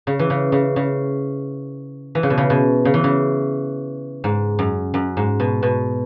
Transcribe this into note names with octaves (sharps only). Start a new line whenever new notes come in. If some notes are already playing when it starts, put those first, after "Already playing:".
C#3
E3
C#3
C#3
C#3
E3
C#3
B2
C#3
B2
C#3
E3
C#3
G#2
F#2
F#2
G#2
B2
B2